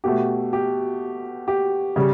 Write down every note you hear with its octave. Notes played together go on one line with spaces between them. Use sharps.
B2 A3 G4
G4
G4
C#3 G3